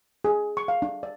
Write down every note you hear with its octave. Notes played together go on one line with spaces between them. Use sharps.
G#4
C#6
F5
D4
D5